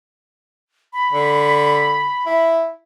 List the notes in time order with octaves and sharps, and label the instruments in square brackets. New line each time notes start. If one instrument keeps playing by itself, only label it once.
[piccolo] B5
[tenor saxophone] D3
E4